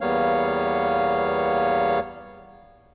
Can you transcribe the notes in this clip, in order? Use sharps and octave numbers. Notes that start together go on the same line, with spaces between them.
E2 G3 A#3 B3 C#5 F5